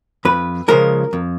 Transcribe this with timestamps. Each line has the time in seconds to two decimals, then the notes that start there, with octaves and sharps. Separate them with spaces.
0.25 F2 B4
0.68 C#3 F3 G#3 A#4
1.13 F2